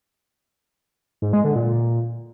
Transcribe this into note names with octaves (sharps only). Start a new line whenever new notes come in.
G#2
G#3
D3
A#2